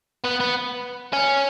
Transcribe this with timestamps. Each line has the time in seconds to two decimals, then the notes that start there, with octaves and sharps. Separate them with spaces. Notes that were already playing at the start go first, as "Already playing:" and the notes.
0.24 B3
0.40 B3
1.13 C#4